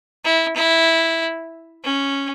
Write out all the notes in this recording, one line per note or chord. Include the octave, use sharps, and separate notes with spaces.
E4
E4
C#4